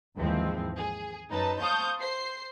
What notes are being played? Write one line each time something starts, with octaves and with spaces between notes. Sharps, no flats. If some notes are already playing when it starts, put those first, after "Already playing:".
D#2 G#2 E3 F3 G#3 C4
G#4
F#2 D#4 B4 A5
C5 F5 A5 C#6 D#6 G6
C5 C7